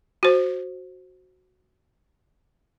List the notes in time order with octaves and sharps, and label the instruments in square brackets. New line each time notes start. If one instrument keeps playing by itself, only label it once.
[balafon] F#4 C5